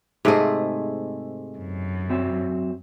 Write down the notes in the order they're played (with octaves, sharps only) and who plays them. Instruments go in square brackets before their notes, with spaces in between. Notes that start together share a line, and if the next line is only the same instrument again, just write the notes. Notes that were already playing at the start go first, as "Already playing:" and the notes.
[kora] G#2 C3 A3 [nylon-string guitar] G#4 D#5
[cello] F#2
[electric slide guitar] F#3 C4 E5